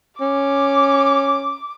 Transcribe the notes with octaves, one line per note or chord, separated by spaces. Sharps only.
C#4 D6